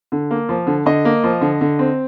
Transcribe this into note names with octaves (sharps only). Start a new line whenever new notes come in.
D3
A#3
F3
D3
D3 D#5
A#3
F3
D3
D3
C4